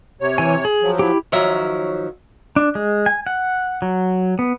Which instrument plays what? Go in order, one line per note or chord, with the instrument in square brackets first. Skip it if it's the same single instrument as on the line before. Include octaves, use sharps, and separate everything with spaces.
[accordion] C3 C#5
[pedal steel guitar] E3 G#5
G#4
[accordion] F3 F#3
[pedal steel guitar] E4 G4
[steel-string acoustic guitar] D#3 F3 F#3 C#5 E5 A#5
[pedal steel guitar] D4
G#3
G#5
F#5
F#3
B3